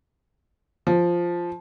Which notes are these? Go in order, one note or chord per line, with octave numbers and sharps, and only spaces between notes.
F3